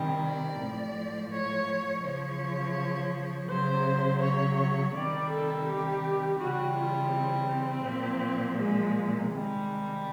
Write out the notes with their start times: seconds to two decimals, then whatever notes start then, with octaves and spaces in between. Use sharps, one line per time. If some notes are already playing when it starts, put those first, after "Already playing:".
Already playing: C3 D#3 G3
0.22 D5
0.59 A2 F3
1.31 C#5
2.03 C#3 F3 C#5
3.48 C#3 F#3 C5
4.20 C#5
4.57 C#5
4.94 C3 D#3 G3 D5
5.29 A4
5.65 G4
6.37 C#3 E3 G3 F#4
6.74 F4
7.10 C4
7.47 C4
7.83 A#2 F3
8.55 G#3
9.28 C3 D#3 G3 G#3